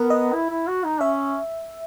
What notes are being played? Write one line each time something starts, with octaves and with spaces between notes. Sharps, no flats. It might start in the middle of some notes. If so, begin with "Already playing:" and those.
Already playing: B3 A#4 B4
D#5
E4
E4
F#4
D#4
C#4 E5